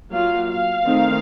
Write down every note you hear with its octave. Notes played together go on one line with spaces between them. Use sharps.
F#3 A#3 F4 F5
F5
D#3 A3 C4 D#4